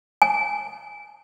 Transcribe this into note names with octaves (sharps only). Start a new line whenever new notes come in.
G#5